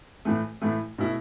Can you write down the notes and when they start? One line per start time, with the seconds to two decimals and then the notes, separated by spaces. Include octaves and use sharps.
0.25 A2 E3 A3
0.62 A2 E3 A3 E4
0.98 B2 A3 E4